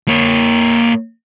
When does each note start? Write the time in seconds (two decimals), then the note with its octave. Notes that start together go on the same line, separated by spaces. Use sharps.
0.08 A#3 C#5